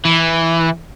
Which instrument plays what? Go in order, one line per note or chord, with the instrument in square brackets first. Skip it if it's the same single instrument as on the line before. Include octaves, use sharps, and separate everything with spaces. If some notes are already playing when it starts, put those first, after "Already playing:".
[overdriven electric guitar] E3